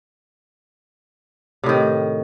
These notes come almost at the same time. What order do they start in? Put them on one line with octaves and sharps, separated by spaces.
C3 A2 D#3